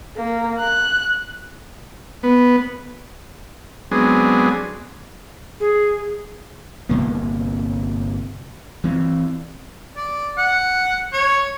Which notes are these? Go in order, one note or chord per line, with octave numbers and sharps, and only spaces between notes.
A#3
F#6
B3
F#3 G#3 B3 C4 D4 G#4
G#4
G1 C3 A#3
E3 C4
D5
F#5
C#5